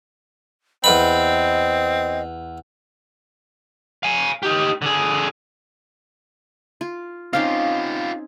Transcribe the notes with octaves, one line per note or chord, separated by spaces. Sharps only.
E2 C4 B4 D#5 B5
F5 G#5
D#4 G4
D3 G#4
F4
C4 C#4 D#4 F4 G4 F5